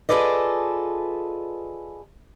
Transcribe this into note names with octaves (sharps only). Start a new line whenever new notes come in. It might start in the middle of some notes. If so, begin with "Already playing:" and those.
F4 G#4 A4 B4 D5 D#5